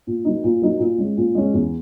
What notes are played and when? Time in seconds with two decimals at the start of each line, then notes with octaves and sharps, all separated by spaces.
0.07 A#2
0.25 F#3 A#3 D#4
0.44 A#2
0.62 F#3 A#3 D#4
0.79 A#2
0.98 G#3 C#4
1.17 A#2
1.35 G#3 C#4
1.54 E2